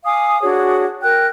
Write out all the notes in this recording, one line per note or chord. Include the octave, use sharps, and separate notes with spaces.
F5 G#5 D6 D#6
D4 F#4 G#4 C#5
A#4 G5 F#6 G6